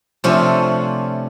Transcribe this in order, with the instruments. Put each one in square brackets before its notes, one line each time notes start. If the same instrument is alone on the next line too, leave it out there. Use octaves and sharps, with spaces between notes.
[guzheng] C3 F3 A3 C#4 D4 C5